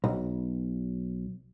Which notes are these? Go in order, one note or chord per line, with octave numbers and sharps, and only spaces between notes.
B1